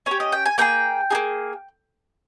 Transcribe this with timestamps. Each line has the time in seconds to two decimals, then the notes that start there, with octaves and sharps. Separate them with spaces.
0.06 C#4 G4 C#5
0.20 D#5
0.32 G5
0.46 G#5
0.58 A#3 D#4 G#4 G5
1.10 D#4 G#4
1.15 A#3